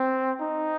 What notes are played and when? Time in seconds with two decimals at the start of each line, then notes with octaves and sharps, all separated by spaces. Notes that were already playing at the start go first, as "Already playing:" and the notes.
Already playing: C4
0.40 D#4